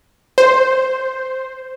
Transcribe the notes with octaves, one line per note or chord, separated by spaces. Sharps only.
C5